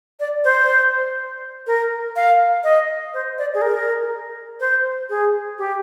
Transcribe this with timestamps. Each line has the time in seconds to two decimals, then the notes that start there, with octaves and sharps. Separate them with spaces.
0.20 D5
0.44 C5
1.67 A#4
2.16 F5
2.64 D#5
3.14 C5
3.38 D5
3.54 G#4
3.62 A#4
4.60 C5
5.10 G#4
5.58 G4